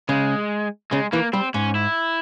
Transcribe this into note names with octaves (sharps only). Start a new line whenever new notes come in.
C#3 G#3
C#3 G#3
E3 A#3
G3 C4
G#2 C#4
E4